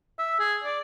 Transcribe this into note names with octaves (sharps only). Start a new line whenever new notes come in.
E5
G#4
D5